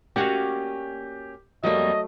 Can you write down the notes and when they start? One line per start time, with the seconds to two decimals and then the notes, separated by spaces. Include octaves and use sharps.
0.16 A#3 C#4 F#4 G4 D5 D#5 F5
1.63 F2 F#3 G3 A3 A#3 D#5